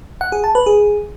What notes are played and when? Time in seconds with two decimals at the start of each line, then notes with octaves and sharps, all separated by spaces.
0.21 F#5
0.32 G#4
0.44 A5
0.55 B4
0.66 G#4